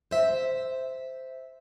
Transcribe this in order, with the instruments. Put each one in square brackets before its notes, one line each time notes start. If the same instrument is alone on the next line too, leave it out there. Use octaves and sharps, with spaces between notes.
[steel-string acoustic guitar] C5 E5